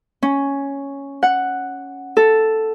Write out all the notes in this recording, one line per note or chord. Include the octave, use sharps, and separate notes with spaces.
C#4
F#5
A4